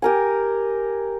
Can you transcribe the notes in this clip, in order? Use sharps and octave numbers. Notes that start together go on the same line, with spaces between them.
G4 A#4 G#5